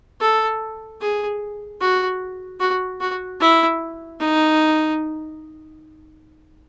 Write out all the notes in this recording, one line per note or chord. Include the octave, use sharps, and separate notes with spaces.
A4
G#4
F#4
F#4
F#4
E4
D#4